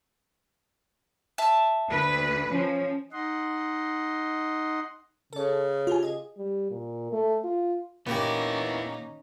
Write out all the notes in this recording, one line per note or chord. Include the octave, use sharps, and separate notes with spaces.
E5 A5
D2 B4
F3 C#4
D#4 D#5 F#5 C6
C#3 A4 C#5
F4 G4 G#5
G#4 D#5
G3
A#2
A3
F4
A#2 A#3 B3 C#4 D#4 E4 G4